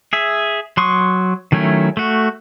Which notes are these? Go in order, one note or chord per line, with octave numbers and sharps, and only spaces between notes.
G#4 E5
F#3 C6 C#6 D#6
D#3 F#3 A3 C#4 E4
A3 F#4